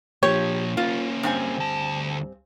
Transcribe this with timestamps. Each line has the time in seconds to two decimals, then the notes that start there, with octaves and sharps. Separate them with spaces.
0.23 A#2 F3 G4 C#5
0.77 A#3 C#4 F4
1.23 G2 C4 G#5
1.58 D2 A5